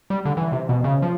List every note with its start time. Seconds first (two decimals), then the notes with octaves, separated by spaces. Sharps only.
0.10 G3
0.25 D3
0.37 E3
0.52 C3
0.69 B2
0.84 C#3
1.02 F3